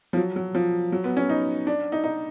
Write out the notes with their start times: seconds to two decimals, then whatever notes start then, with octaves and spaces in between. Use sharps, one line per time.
0.13 F3
0.17 F#3
0.36 F#3
0.55 F3
0.92 F#3
1.04 B3
1.17 C#4
1.29 D#4
1.67 D4
1.92 D#4
2.04 D#4